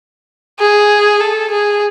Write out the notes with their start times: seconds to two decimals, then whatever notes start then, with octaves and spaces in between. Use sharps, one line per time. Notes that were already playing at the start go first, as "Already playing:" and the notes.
0.60 G#4
1.20 A4
1.50 G#4